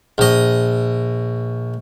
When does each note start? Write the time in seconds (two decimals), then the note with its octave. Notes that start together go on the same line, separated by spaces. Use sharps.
0.18 A#1 D#5